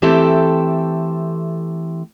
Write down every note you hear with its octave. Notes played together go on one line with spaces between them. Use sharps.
E3 A3 C4 G4 A4 E5